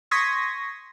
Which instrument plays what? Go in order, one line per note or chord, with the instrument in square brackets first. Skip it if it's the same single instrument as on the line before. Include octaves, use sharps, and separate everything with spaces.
[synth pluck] C6 C#6 D#6 G#6 A#6 B6